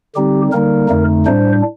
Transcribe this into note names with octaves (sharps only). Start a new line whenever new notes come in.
D3 G3 C4 D#4 G4
D3 G3 A#3 D#4 A#4
F2 D3 A3 D#4
A2 G3 D4 C5